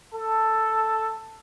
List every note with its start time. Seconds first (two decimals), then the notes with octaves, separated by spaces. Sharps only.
0.15 A4